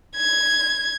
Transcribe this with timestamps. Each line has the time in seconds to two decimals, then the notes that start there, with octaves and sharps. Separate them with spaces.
0.16 G#6